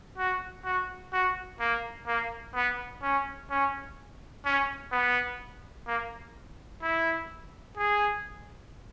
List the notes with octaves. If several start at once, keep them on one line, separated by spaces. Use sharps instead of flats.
F#4
F#4
F#4
A#3
A#3
B3
C#4
C#4
C#4
B3
A#3
E4
G#4